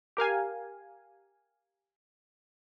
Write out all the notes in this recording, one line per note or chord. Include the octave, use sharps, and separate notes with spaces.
G4 A#4 F5 G#5